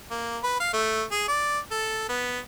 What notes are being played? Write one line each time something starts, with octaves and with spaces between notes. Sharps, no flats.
A#3
B4
F5
A3
G#4
D5
A4
B3